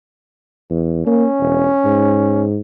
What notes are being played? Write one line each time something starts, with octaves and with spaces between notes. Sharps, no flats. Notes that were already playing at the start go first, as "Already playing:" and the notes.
E2
A#3 C#4
E1
G#2